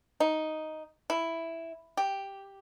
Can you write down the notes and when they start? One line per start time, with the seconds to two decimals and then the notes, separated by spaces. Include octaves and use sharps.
0.20 D#4
1.10 E4
1.97 G4